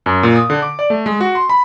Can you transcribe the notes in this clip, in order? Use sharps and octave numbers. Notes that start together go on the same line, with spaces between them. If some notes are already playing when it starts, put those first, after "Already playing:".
F#2
A#2
D#6
D3
D6
D5
A3
G#3
F#4
C6
B5